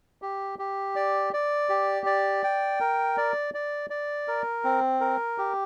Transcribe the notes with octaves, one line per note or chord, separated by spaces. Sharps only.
G4
G4
D5
D5
G4
D5
G5
A#4
D5
D5
D5
A#4
C4
A#4
G4